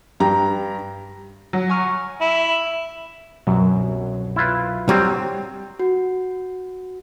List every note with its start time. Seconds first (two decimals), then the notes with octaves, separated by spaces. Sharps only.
0.20 G2 G4 A#5
1.53 F#3
1.69 G#5 C#6 F6
2.21 E4
3.47 C2 F#2 B2 F#3
4.36 E4 F4 B4
4.89 F#3 G3 C4
5.80 F#4